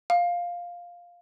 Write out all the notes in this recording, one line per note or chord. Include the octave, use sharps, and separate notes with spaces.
F5